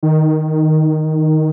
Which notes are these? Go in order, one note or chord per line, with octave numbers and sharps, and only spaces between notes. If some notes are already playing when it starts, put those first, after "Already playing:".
D#3